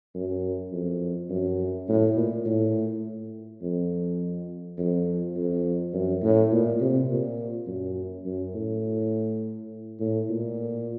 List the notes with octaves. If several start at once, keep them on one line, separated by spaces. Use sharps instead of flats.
F#2
F2
F#2
A2
A#2
A2
F2
F2
F2
F#2
A2
A#2
C3
A#2
F#2
F#2
A2
A2
A#2